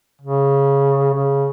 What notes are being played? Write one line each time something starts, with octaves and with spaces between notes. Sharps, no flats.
C#3
C#3